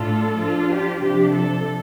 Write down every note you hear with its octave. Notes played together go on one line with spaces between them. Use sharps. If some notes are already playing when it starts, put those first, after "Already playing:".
Already playing: A2 A3 D4 F4 A4
F3 D4 F4
G4
C3 F3 D4 G4
A4